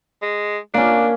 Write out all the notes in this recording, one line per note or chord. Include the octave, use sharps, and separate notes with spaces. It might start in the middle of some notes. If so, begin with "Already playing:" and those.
G#3
A#3 C#4 D4